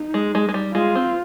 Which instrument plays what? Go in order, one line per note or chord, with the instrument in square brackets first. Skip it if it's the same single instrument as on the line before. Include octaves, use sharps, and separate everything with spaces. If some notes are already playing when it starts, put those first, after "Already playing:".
Already playing: [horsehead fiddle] D#4
[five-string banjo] G#3
G#3
G#3
G3
[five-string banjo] G#3 [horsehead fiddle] F4
[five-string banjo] C4